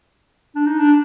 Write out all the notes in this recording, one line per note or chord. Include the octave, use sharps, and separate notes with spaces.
D4
D#4
D4